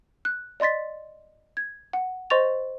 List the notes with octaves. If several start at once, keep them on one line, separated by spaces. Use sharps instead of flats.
F#6
D5 D#5 C6 A6 B6
G#6
F#5
C5 D#5 C6 C#6 A6 F7